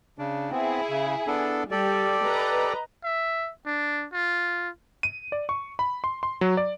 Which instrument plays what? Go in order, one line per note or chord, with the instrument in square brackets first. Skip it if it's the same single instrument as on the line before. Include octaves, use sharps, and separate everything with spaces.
[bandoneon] C#3 D4
[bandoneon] B3 C4 [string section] E4 G#4
[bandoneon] C#3
B3 D4 A4
[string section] G3 [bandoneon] G4 A4 D5
[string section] B4 D#5 A#5
[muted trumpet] E5
D4
F4
[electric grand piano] D#7
D5
C#6
B5
C6
C6
F#3
D5